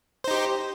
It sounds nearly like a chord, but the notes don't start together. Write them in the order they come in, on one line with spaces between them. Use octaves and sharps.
C5 D#4 G4